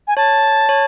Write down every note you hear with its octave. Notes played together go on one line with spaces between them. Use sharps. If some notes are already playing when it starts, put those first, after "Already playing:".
G#5
C#5 A5
C#5